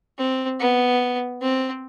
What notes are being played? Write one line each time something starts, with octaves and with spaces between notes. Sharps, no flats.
C4
B3
C4